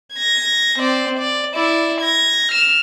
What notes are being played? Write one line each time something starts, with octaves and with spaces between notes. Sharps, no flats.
G#6 A#6
C4 D5
D5
E4 D5
G#6 A#6
F6 E7